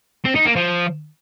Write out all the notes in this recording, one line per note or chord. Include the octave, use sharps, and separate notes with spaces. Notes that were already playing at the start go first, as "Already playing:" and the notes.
C4
D#4
A#3
F3